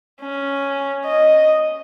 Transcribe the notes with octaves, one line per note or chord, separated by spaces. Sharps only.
C#4
D#5